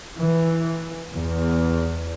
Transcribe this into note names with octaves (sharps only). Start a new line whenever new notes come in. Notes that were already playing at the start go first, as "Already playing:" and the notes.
E3
E2